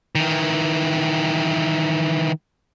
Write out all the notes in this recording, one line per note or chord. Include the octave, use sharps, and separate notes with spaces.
D#3 E3